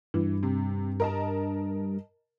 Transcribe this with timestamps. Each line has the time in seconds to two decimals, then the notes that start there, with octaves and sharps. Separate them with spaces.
0.14 G2 E3
0.43 C3
1.00 A#4 D#5 A5